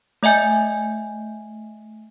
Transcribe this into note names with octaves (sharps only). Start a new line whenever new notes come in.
A3 D#5 E5 G#5 G6